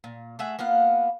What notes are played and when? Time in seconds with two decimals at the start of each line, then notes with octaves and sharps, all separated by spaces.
0.04 A#2
0.39 A3 G#4 E5 F#5
0.59 A#3 B3 F4 F#5